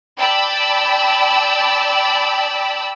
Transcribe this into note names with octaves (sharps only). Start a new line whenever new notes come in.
D5 G5 A5 B5 E6